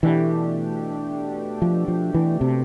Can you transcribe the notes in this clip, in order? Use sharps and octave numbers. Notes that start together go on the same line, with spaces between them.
B2 E3 A3 D4 G4
F3
F3
E3
C3